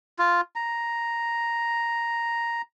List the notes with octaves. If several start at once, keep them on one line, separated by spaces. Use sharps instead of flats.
F4
A#5